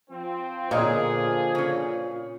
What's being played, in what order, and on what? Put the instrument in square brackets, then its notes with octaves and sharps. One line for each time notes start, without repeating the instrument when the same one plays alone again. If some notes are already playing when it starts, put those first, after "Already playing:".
[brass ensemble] F3 C4
[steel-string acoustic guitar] A#2 [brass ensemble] D3 F3 G#4 [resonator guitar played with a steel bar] A#4 C#5 D#5
[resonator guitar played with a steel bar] C#3 C#4